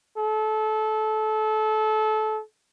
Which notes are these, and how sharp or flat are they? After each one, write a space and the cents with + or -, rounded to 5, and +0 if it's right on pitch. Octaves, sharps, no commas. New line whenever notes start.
A4 -25